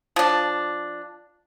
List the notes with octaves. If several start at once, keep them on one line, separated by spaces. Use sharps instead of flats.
F3 D4